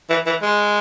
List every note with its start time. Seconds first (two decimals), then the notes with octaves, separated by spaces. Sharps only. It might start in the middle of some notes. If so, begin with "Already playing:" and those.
0.10 E3
0.26 E3
0.42 G#3